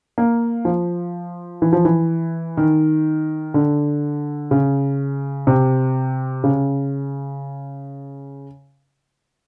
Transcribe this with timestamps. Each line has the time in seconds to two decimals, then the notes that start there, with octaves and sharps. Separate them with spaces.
0.18 A#3
0.65 F3
1.62 E3
1.73 F3
1.85 E3
2.57 D#3
3.54 D3
4.51 C#3
5.47 C3
6.44 C#3